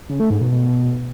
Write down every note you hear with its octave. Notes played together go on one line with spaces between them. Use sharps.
C#3
A3
G#2
B2
B2